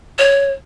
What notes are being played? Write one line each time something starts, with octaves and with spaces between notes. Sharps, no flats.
C#5